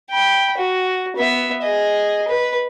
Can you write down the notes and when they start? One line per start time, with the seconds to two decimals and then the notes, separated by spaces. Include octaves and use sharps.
0.10 G5 B5
0.57 F#4
1.16 B3 E5
1.62 G#4 D#5
2.28 B4